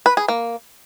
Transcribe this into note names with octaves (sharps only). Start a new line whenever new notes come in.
B4
G#4
A#3